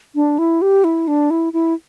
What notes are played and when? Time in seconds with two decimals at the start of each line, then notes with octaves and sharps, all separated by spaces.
0.15 D4
0.39 E4
0.62 G4
0.84 E4
1.08 D4
1.30 E4
1.53 E4